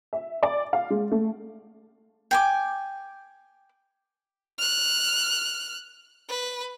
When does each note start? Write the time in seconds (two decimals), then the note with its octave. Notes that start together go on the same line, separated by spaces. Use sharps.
0.13 E5
0.43 D5
0.73 F5
0.90 G#3
1.11 A3
2.31 G5 G#5 D6
4.58 F6 F#6
6.29 B4